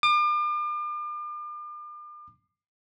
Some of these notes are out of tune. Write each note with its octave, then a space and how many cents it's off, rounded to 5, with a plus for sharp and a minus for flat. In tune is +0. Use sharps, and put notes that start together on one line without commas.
D6 +40